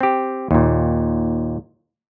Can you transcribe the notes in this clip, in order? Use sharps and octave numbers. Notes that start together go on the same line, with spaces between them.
C4 G4
D#2 A#2